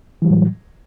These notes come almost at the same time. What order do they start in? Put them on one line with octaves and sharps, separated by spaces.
E3 G3 F#3 A2